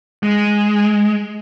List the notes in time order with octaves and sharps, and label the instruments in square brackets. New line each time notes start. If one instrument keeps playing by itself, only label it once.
[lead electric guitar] G#3